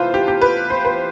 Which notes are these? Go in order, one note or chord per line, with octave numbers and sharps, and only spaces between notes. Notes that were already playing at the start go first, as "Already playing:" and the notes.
Already playing: C3 E3 A3 F4 B4 C5
G4
G4
B4
C5
B4